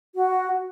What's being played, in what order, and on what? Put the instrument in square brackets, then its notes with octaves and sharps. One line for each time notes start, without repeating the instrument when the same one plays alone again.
[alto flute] F#4